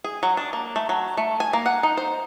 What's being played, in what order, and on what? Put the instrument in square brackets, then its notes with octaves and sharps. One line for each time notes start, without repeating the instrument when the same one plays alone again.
[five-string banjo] G#4
F#3
D4
A#3
A3
F#3
A3
G#5
A#3
F#5
D#4
C5